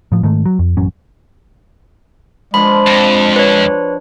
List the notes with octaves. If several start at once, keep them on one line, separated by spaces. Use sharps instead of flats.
A2 F3
G#2 D#3 A3
F#3
F2
A1 F#2 F#3 C#4
F3 G#3 D4 B5
F2
B4 C#5